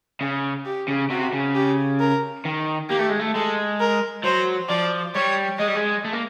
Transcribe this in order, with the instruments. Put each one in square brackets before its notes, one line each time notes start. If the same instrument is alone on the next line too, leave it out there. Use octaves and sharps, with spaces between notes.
[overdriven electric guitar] C#3
[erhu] G4
[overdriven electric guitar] C#3
[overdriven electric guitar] C3 [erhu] F#4
[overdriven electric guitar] C#3
[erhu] G4
A#4
[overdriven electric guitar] D#3
[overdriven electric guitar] A#3 [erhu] G4
[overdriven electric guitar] A3
G#3
A3
[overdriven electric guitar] G#3 [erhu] A4
[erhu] A#4
[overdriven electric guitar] F#3 [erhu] C5
[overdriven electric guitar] F3 [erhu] D5
[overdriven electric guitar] G3 [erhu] C#5
[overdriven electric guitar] G#3 [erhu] D#5
[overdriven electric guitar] G3
G#3
A3
A#3